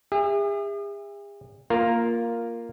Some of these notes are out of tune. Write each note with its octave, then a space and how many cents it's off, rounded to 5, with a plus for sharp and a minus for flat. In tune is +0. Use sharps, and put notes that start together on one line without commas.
G#4 -45 E5 +0
A#3 +0 F4 +0 A#4 +0